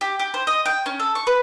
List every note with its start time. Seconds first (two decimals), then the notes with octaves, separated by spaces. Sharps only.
0.01 G4
0.19 G4
0.34 C5
0.47 D#5
0.66 G5
0.86 C#4
0.99 A4
1.15 C#6
1.27 B4